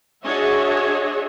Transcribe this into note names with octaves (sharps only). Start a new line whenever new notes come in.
D4 F#4 G#4 C#5 D#5 E5